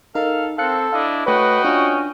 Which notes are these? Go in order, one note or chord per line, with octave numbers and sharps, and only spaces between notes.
D#4 A4 A#4 F5
C4 A4 F5 F#6 C#7
D4 E4 D#5 F5
A3 F#4 B4 C#5 D#5 G5
C#4 D4 F4